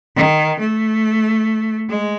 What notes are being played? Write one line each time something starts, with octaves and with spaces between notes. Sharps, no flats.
D#3
A3
G#3